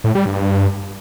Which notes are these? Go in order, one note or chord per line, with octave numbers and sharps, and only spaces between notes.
A2
G3
G2